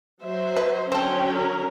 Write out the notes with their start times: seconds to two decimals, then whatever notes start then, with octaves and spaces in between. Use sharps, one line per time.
0.23 F#3 C5 E5
0.56 B4
0.92 D3 F#3 C4 C#4 A4 G5
1.36 A#4